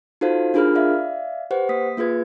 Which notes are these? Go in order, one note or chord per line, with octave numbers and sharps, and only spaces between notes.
D#4 F4 F#4 A4 C5 F5
D4 F4 G#4 A#4 B5 F6
D5 E5 F5
G4 B4 C5 F#5
A#3 D#6 B6
A#3 F4 G#4 B4 G#6